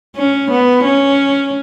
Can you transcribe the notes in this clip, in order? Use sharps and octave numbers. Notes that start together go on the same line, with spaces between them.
C#4
B3
C#4